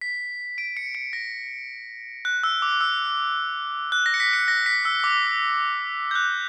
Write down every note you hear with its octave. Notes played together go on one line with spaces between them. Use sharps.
B6
D7
C#7
C#7
A#6
F#6
E6
D6
E6
F#6
A#6
C#7
B6
C#7
A#6
B6
E6
D6
G6
F#6